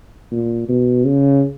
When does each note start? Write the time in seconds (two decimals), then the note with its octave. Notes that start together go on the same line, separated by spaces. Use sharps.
0.32 A#2
0.69 B2
1.05 C#3